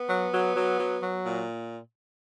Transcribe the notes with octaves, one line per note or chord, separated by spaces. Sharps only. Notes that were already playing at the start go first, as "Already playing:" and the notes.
Already playing: B3
F#3
F#3
F#3
F#3
F#3
A#2